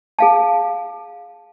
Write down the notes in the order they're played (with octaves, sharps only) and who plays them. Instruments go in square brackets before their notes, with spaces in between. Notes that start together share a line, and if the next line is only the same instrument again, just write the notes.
[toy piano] G#4 F5 A5